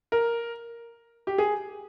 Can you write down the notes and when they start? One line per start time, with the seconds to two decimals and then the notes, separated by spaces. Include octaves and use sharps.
0.12 A#4
1.27 G4
1.38 G#4